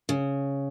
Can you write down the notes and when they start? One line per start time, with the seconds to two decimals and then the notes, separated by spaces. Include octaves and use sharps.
0.09 C#3